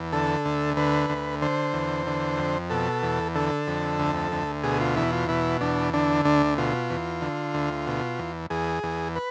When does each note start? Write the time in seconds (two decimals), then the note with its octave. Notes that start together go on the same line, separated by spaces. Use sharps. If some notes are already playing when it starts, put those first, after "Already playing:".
Already playing: E2
0.12 D3 A4
0.45 D2
0.77 D3 B4
1.10 D2
1.42 D3 C5
1.73 E2
2.07 D3
2.38 F2
2.70 B2 A4
3.03 E2
3.35 D3 A4
3.67 F2
3.99 D2
4.32 D2
4.63 B2 G#4
4.81 F4
4.96 E2 E4
5.12 F4
5.29 B2 E4
5.61 E2 D4
5.93 D3 D4
6.25 D2 D4
6.58 B2 F4
6.90 E2
7.22 D3
7.54 D2
7.87 B2
8.19 E2
8.50 E2 G#4
8.83 E2
9.16 B4